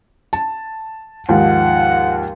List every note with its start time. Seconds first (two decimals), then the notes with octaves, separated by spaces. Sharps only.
0.33 A5
1.29 D#2 G#2 F3 F#5